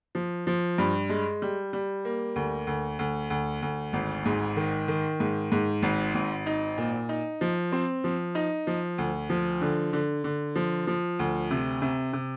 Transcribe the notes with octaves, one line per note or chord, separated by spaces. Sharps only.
F3
F3
G2
G#3
G3
G3
A#3
D2
D2
D2
D2
D2
G#1
G#2
D#3
D#3
G#2
G#2
G#1
G#1
D#4
A#2
D#4
F3
C4
F3
D#4
F3
D2
F3
D3
D3
D3
F3
F3
D2
C3
C3
C3